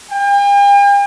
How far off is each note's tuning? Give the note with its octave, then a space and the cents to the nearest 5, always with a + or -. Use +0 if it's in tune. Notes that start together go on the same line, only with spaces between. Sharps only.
G5 +45